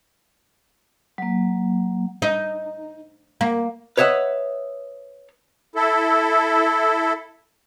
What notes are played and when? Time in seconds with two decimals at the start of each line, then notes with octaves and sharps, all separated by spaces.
1.18 F#3 A#3
2.22 D#4
3.41 A#3
3.97 B4 C#5 D#5 E5 F#5
5.75 E4 A4